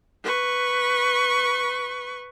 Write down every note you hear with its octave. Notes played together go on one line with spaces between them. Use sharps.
B4 C#6